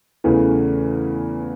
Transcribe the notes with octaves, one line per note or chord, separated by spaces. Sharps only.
E2 C#3 E3 A3